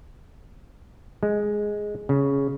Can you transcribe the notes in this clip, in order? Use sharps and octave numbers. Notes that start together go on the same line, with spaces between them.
G#3
C#3